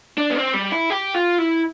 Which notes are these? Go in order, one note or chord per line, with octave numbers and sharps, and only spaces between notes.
D4
B3
C4
G3
E4
G4
F4
E4